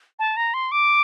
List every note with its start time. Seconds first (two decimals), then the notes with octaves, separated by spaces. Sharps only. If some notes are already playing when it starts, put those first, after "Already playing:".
0.19 A5
0.37 A#5
0.54 C6
0.72 D6